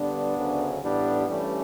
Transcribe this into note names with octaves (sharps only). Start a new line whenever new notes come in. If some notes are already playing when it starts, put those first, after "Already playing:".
Already playing: G2 D3 G3 B3 D4
D2 C#3 F#3
A1 A2 G3 B3 D4
G2 E3 G3 A3 C#4